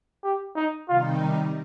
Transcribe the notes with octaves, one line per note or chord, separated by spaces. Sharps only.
G4
D#4
C3 D#3 G3 D#4 F4